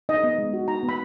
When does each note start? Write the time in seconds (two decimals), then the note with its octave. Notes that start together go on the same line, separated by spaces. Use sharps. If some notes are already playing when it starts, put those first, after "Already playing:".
0.09 D#4 D#5
0.24 B3
0.38 G#3
0.54 F#4
0.68 D#4 A#5
0.83 B3
0.89 B5